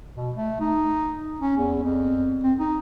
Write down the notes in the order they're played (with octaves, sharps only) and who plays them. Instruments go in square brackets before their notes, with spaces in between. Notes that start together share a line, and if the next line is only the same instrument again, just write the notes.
[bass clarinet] B2
A3
D#4
C#4
E2
F2
C4
D#4